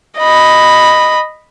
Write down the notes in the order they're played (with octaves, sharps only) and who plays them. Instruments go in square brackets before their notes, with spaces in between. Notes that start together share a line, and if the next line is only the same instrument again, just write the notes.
[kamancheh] D#5 B5